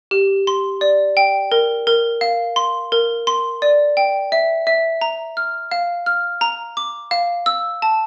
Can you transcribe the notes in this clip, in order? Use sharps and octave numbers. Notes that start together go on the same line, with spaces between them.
G4
C6
D5
G5
A#4
A#4
F5
C6
A#4
C6
D5
G5
E5
E5
A#5
F6
F5
F6
A#5
D6
F5
E6
A5